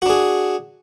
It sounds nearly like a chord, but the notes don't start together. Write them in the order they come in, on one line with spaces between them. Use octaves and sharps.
F#4 D4 G#4